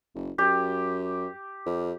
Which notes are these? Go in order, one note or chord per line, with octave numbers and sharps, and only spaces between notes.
F#1
F#2 G4
F2